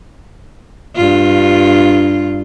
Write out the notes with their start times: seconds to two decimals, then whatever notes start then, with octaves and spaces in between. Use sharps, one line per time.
0.96 G2 F4